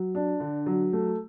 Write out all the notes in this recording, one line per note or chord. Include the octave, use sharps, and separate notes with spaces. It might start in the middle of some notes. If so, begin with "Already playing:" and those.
Already playing: F#3
D4
D3
F#3
A3